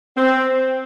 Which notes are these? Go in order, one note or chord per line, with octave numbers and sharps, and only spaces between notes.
C4